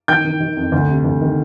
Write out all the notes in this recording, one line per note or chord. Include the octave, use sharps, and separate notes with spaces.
D#3 G5 G6
D#3
D#3
F2
D2
C3
D2
D#3